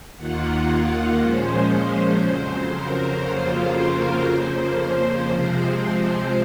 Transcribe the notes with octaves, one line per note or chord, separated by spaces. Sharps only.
D#2 D#3 A#3 F4 F#5
A#2 F3 G#3 C#4 C5
C5
F2 C#3 F#3
A#4
F2 C#3 F#3 A#3 F4 C5
A#4
F2 C#3 F3 A#3 C5
C3 F3 G#3 C4